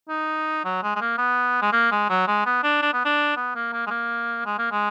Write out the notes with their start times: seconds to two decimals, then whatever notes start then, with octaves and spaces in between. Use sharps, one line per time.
0.09 D#4
0.64 F#3
0.83 G#3
0.95 G#3
1.01 A#3
1.18 B3
1.62 G#3
1.72 A#3
1.91 G#3
2.09 F#3
2.27 G#3
2.46 B3
2.63 D4
2.82 D4
2.93 B3
3.05 D4
3.36 B3
3.55 A#3
3.72 A#3
3.86 G#3
3.90 A#3
4.46 G#3
4.58 A#3
4.71 G#3